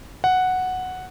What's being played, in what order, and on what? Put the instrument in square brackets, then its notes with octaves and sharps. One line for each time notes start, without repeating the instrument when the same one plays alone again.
[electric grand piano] F#5